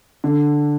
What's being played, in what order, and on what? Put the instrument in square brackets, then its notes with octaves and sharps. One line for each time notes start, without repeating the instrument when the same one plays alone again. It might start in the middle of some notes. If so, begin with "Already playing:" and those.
[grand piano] D3